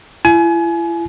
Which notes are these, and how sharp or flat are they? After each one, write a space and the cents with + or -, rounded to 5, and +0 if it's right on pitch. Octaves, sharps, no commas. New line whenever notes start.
E4 +40 G#5 +30